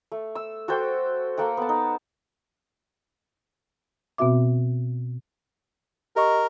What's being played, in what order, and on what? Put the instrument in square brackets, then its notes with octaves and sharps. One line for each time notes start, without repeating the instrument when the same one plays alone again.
[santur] A3
E6
F#4 A4 C5 G5
A#3 A4 F#5 G5
B3 A5
D#4
[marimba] B2 B3 C4 F#4 E5 D6
[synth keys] G4 D#5 C#6 [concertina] A#4